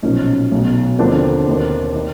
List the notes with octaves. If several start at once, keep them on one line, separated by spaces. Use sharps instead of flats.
B1 A#2 F3 C#4 D#4
B1 B2
D#2 D3 F3 C4 D4
D#2 D#3
D#3